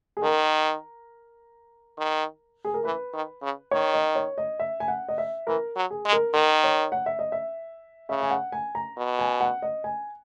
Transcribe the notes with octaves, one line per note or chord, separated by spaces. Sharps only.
G#4
D#3 A#4
D#3
G#4
A#4
E3 B4
D#3
C#3
D#3 C#5
D#5
C#5
D#5
E5
G#5
F#5
D#5
E5
E3 A#4
F#3
G#4
G#3
A#4
D#3 A#4
C#5
F#5
E5
D#5
E5
C#3 E5
G#5
F#5
G#5
A#5
B2
G#5
F#5
D#5
G#5